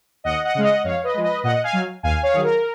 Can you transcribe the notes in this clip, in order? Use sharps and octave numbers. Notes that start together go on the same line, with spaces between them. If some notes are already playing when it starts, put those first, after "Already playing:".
D#2 D#5 F#5
D#5 F#5
C#3 G#3 F5
D#5 F#5
F2 C#5 F5
B4 D#5
F3 G#3
B4 D#5
A#2 D#5 F#5
F5 G#5
F#3
D#2 F5 G#5
C#5 F5
D#3 F#3 G#4
A#4